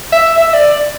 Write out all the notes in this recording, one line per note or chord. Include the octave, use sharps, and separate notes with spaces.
E5
E5
D5